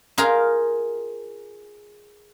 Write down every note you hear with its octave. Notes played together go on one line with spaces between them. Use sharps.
D#4 F4 G#4 A#4